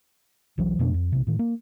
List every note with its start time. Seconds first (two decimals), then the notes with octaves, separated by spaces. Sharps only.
0.58 B1 E3 F#3
0.79 F2 B2 A3 D4
0.94 F2
1.12 A#1 C3
1.27 A2 D#3
1.39 A#3